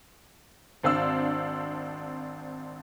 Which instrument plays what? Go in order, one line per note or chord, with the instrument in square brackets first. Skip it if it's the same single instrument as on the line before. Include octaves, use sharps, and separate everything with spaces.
[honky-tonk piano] G#1 C4 D4 F5 E6